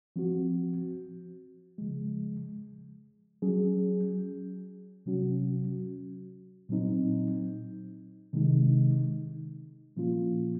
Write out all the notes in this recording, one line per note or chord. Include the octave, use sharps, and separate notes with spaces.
F3 C4 F#4
C#3 F3 G#3
F#3 C#4 G#4
C3 F#3 C#4 F#4
A#2 F#3 C4 D#4
C3 D#3 G#3 D#4
A#2 F3 A#3 C#4 F4